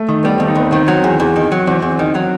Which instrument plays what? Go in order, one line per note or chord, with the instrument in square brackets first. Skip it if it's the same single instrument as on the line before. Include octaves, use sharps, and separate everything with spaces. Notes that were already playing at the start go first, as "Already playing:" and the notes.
Already playing: [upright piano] A3
[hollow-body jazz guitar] D#3
[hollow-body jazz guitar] G3 [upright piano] B3
[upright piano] C4
[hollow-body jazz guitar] D#2
[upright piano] D#4
[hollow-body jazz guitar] D#2 [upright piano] B3
[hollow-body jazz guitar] D#3 [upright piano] C4
[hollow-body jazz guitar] F#3
E2
E2
D#3
F#3
[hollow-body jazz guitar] E2 [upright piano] C4
[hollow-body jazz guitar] E2
D#3
F#3